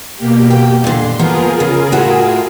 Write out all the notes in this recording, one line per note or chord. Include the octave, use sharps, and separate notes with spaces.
B2 A#3 G4
G5
A#2 D3 C6
F3 A#3 B3 F4 G#4 A#4
C#3
A2 F#4 E5